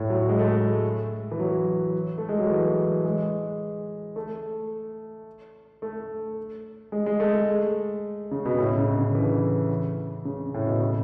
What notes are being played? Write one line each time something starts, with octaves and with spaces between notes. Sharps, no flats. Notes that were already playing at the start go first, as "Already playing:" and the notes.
Already playing: A2
F#3
G#3
A3
G#3
E3
F#3
A3
G#3
F#3
E3
G#3
A3
A3
G#3
G#3
A3
G#3
C#3
B2
A2
C#3
D3
E3
C#3
A2
B2
C#3